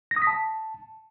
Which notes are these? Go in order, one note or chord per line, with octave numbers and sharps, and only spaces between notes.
A#6
D#6
B6
A5